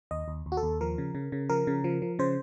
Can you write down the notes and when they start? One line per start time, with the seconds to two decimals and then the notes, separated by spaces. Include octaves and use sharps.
0.11 D#2 D#5
0.28 D#2
0.46 D#2
0.52 F#4
0.57 A4
0.63 D#2
0.81 F3 A#4
0.98 C#3
1.15 C#3
1.32 C#3
1.49 F3 A#4
1.67 C#3
1.84 F3
2.02 F3
2.19 C#3 C5